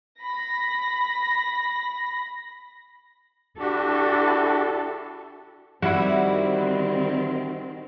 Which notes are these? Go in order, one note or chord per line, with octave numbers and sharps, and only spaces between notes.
B5 A#6
D4 E4 F#4 G4 A4
D#3 G3 C4 E4 F#4